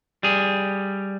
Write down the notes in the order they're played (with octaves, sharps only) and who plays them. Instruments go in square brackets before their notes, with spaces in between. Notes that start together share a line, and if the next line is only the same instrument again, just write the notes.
[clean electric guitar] G3 G#4